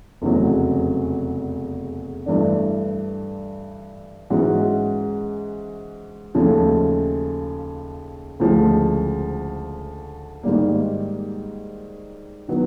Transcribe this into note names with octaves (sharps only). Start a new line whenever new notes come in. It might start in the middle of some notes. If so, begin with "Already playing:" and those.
F1 E2 C#3 F#3
G2 E3 A3 D4
G#2 E3 G#3 C#4 F#4
D#2 C#3 F3 A3 C#4
D2 C#3 F3 G#3
G#2 D#3 G3 A#3
D#3 F#3 B3